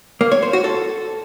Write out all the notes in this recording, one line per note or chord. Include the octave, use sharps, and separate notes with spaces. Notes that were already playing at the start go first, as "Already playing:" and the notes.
A#3
C#5
C5
F#4
A4